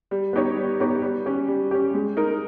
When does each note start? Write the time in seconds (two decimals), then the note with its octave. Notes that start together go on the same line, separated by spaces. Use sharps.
0.11 G3
0.33 B3 D#4 G4 C#5
0.57 G3
0.80 B3 D#4 G4 C#5
1.02 G3
1.26 C#4 G4
1.48 G3
1.71 C#4 G4
1.94 G#3
2.17 D#4 A#4